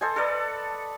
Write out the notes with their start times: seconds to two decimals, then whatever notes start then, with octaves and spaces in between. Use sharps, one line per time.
0.01 A4 C5 D#5 G#5
0.16 A4 B4 D5 D#5